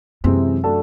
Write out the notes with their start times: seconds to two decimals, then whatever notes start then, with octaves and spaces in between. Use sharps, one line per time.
0.24 F#2 C3 E3 G#3 C4
0.64 A3 D4 F#4 A4